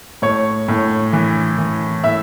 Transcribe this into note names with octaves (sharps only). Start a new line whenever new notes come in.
A2 C#5
A2
E3
E3
A2 E5